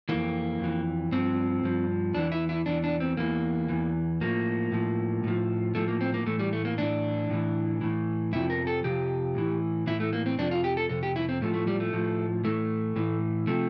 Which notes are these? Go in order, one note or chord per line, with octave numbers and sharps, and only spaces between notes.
F2 E3 A#3
F2 E3
G2 F3 C4
G2 F3
E2 E3 D4
E4
E4
E2 E3 D4
D4
C4
E2 E3 A#3
E2 E3
A2 F3 A#3
A2 F3
A2 F3
A2 F3 A3
A#3
C4
A#3
A2 E3 A3
G3
A3
A#3
A2 E3 D4
A2 E3
A2 E3
F2 C3 F3 E4
A#4
A4
F2 C3 F3 G4
A2 E3
A2 E3 E4
A3
A#3
C4
F2 C3 F3 D4
F4
G4
A4
F2 C3 A4
G4
E4
C4
A2 F3 A3
A3
G3
A3
A2 F3
A2 E3 A3
A2 E3
C3 F3 A3